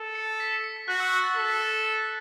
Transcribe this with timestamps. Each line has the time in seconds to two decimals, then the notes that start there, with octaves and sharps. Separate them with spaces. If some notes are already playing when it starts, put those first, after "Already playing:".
Already playing: A4
0.15 C#7
0.40 B6
0.64 C#7
0.76 B6
0.88 F#4 F#6
1.00 E6
1.12 E6
1.24 A6
1.36 A4 B6
1.49 B6
1.60 A6
1.73 B6
1.85 C#7